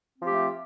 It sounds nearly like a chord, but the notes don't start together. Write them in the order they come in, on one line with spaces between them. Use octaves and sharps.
C4 F3 G4 A3